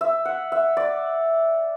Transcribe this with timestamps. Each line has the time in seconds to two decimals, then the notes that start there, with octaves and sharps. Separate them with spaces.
0.01 E5
0.25 F#5
0.52 E5
0.77 D5